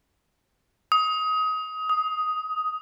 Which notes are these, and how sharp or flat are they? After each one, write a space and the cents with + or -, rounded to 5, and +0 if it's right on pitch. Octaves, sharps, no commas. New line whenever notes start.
D#6 +25
D#6 +5